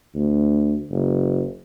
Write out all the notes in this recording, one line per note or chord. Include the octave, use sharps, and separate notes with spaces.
D2
F#1